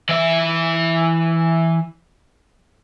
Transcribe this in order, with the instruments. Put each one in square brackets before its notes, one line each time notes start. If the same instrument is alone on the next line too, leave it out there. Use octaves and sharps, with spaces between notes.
[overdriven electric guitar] E3 E5